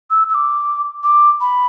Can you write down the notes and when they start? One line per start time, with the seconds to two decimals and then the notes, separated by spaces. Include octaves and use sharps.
0.11 E6
0.29 E6
0.34 D6
1.03 D6
1.41 B5